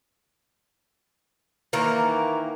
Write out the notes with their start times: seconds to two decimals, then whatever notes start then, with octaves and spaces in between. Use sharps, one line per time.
1.73 D#3 E3 A#3 A#4